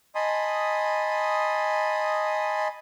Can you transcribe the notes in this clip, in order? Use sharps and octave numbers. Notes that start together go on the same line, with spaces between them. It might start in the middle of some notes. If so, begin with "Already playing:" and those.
D#5 G#5 A5 B5 C6 D#6